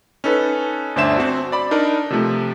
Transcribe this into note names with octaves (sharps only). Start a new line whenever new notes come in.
C#4 D#4 A4 B4
G1 D2 D4 C5 E5 E7
C4 F#4
D5 B5
D4 D#4 A#4
C3 F3 A3